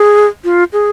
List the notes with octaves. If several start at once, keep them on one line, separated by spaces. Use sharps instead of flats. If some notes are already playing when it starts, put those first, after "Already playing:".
Already playing: G#4
F4
G#4